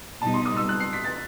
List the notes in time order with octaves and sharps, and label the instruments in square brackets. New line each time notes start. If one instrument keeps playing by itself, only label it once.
[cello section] B2 G3 D#4 [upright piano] A5
[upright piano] C6
D#6
E6
F#6
C7
B6
A6